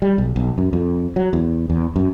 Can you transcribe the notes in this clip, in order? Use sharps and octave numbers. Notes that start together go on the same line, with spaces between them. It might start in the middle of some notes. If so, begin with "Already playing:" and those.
G3
B1
B1
F#2
F2
F#3
E2
E2
F#2